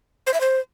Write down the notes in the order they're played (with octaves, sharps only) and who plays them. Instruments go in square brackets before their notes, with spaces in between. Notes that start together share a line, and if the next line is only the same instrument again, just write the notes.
[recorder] C5
E5
C5